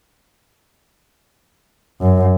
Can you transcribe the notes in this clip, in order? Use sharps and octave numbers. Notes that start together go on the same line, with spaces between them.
F#2